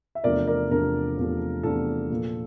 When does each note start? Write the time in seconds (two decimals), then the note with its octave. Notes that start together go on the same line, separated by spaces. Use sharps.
0.15 E5
0.24 E2 C3 F3 A3 D4 A#4 D5
0.47 A#4 D5
0.70 E2 C3 F3 A3 D4 A#4
1.17 E2 C3 F3 A3 D4
1.63 E2 C3 F3 A3 D4 A4
2.10 A#2 F3 A#3